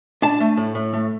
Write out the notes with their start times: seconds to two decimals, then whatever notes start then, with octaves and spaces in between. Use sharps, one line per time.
0.22 D4 A5
0.40 A3
0.57 A2
0.75 A2
0.93 A3